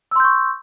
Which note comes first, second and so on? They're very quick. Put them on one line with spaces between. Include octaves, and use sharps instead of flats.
E6 C6 G6 C#6